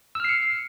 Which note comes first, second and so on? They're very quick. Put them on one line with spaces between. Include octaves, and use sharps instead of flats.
E6 F6 C7 C#7